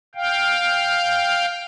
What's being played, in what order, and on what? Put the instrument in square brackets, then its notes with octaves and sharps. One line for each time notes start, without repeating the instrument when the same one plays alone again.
[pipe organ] F5 G5